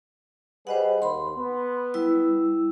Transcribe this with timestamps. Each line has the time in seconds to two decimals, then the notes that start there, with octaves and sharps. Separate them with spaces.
0.67 G3 G#4 B4 C5 D#5 F#5
1.02 D#2 B5 C6
1.37 B3
1.94 G3 E4 E6